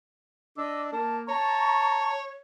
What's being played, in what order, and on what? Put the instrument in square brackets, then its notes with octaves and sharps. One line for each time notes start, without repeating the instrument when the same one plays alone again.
[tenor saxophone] D4 [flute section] D#5 D6 E6
[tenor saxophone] A#3 [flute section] A5
[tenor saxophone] C#5 [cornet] A5 [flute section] A#5 C#6